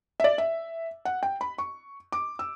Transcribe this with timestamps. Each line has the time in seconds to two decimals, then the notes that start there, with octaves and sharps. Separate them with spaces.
0.20 E5
0.24 D5
0.38 E5
1.05 F#5
1.23 G5
1.41 B5
1.58 C#6
2.12 D6
2.39 E6